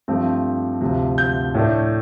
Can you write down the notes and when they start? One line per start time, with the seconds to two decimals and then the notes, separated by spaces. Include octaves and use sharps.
0.08 G2 F3 A3 C4
0.81 D2 C3 F3
1.18 G6
1.54 A2 A3 D4